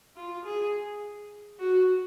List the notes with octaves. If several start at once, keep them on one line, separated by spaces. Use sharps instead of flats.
F4
G#4
F#4